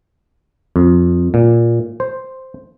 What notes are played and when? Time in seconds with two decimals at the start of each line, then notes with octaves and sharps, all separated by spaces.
0.76 F2
1.34 A#2
2.00 C5